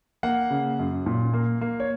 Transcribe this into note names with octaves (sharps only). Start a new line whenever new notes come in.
A#3 F#5
C#3
F#2
A#2
A#3
A#3
C#5